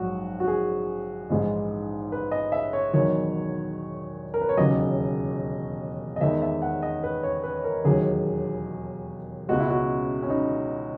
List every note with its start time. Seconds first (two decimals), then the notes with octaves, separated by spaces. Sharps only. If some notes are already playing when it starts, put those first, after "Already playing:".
Already playing: A#1 G#2 F#3 F#4
0.40 F#4
0.48 G#4
1.30 A#1 G#2 E3 G#3
2.12 B4
2.32 D#5
2.52 E5
2.73 C#5
2.94 E1 E2 D#3 F#3 C#5
4.34 A#4
4.41 B4
4.49 C#5
4.57 E1 D#2 C#3 F#3 D#5
6.16 D#5
6.21 E2 D#3 G#3 E5
6.42 E5
6.62 F#5
6.82 D#5
7.03 B4
7.23 C#5
7.44 B4
7.64 A#4
7.84 E1 D#2 D#3 F#3 G#4
9.49 C#2 B2 G#3 F#4
9.60 E4
9.70 F#4
10.22 C#4
10.30 D#4